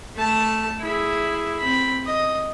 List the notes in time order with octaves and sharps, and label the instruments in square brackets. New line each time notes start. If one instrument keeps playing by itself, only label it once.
[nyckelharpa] A3 A5
E4 G#4
C4 B5
D#5